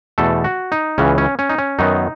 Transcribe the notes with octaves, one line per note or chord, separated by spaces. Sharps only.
E2 B2 A3 A4
F#4
D#4
C#2 C#3 E3 C#4
C#4
C#4
D#4
C#4
F#2 D#3 F#3 B3 D#4